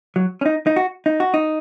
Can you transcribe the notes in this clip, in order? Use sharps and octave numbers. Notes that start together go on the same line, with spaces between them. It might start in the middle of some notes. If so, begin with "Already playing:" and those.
F#3
C#4
D#4
D#4
F#4
D#4
F#4
D#4